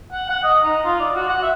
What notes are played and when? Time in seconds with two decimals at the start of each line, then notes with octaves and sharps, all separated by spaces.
0.12 F#5
0.30 F#5
0.43 D#5
0.63 D#4
0.85 F4
1.00 D5
1.15 F#4
1.29 F#5
1.42 E5